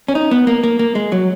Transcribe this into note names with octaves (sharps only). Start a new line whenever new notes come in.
C#4
D#4
B3
A#3
A#3
A#3
G#3
F#3